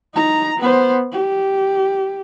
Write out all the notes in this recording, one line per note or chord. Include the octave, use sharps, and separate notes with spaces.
D#4 A#5
B3 C5
G4